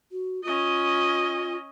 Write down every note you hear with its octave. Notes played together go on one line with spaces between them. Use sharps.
F#4
C#4 F4 D#5